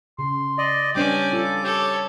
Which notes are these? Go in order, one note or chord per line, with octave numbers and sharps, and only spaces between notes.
C#3 C6
D5 D#5
G3 C#4 D4 B4 D5 G5 D6
F4 A4
G4 A4 C#5